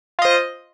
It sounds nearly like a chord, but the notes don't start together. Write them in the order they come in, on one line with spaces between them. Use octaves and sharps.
F4 D#5 C5